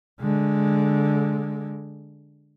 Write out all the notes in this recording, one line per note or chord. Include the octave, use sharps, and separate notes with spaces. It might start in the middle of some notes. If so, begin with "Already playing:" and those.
D3 G#3